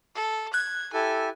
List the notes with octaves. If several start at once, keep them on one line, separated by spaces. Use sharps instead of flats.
A4
F#6 G#6
E4 G4 A4 G#5